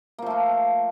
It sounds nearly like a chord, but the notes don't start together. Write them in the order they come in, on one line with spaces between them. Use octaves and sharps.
A#3 F3 A3 F4